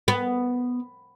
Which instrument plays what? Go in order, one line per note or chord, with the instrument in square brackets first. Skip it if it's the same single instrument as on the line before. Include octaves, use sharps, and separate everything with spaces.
[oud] B3